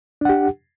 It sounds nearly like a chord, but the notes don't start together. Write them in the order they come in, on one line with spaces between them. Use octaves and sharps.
D4 F#5 G4